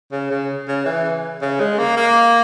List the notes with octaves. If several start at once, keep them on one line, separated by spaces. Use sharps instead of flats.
C#3
C#3
C#3
E3
C#3
G#3
A#3
A#3